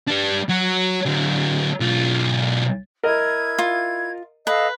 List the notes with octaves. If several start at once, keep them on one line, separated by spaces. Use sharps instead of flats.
G3 D4
F#3
D3 F#3
B1 F4
E4 A#4 D#5 G#6
F4
A4 B4 D#5 F5